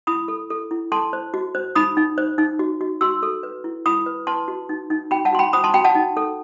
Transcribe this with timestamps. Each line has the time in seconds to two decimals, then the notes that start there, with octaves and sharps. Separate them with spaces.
0.07 E4 B5 D#6
0.28 A4
0.50 A4
0.71 E4
0.92 A4 A5 C6
1.13 C5
1.34 F#4
1.55 C5
1.75 D#4 B5 D#6
1.97 D#4
2.18 C5
2.38 D#4
2.59 F#4
2.81 F#4
3.01 F#4 C6 E6
3.23 A4
3.43 B4
3.64 E4
3.86 E4 B5 D#6
4.06 B4
4.27 B4 A5 C6
4.48 F#4
4.69 D#4
4.90 D#4
5.11 F#4 G5 B5
5.25 F#5 A5
5.33 F#4 C6
5.39 G5 B5
5.53 C5 B5 D#6
5.64 A5 C6
5.74 F#4 G5 B5
5.85 F#5 A5
5.95 D#4
6.17 A4